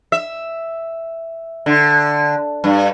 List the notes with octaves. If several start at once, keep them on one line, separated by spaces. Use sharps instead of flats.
E5
D3
G2